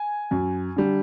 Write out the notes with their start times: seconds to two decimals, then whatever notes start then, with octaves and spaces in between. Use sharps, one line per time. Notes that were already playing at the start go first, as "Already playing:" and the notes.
Already playing: G#5
0.31 F#2
0.76 D3 G3